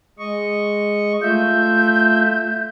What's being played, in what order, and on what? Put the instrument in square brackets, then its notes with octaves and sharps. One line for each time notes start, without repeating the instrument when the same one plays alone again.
[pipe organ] G#3 D#5 C#6
[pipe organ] A3 F4 E5 [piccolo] G6